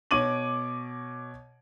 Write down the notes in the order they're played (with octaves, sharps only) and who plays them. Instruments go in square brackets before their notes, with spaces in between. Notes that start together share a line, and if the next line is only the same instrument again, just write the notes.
[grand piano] B2 C#5 D6 D#7 F#7